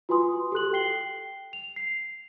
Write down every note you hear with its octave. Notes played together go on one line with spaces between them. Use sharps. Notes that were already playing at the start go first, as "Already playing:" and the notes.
F4 F#4 B4 G#5 C6 D#6
G4 A4 F#6 F#7
G5 C7 G7
F7
C7